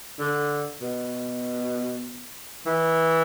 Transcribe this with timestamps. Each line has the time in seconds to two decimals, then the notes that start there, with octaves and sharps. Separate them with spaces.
0.20 D3
0.81 B2
2.66 E3